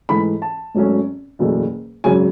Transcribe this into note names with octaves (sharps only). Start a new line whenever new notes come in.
G#2 E3 A3 B5
A5
G#1 G#2 F#3 A3 C#4
F#1 E2 B2 A3
G#1 F#2 C#3 F#3 G#5